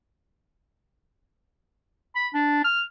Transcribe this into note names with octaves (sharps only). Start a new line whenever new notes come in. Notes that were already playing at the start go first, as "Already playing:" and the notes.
B5
D4
F6